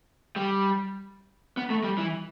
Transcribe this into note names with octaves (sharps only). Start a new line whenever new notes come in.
G3
B3
A3
G3
E3